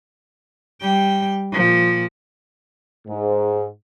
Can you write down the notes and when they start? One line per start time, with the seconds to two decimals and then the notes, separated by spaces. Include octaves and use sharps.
0.81 G3 G5
1.53 A#2 F3
3.08 G#2